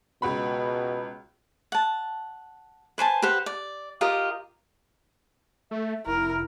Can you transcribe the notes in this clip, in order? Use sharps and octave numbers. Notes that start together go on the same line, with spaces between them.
C#2 B2 F#4 B5
F#5 A5
B4 C5 G#5 A5
G4 B4 C5 F#5
D5
F4 G4 A#4 D#5
A3 E5
F1 E4 A#4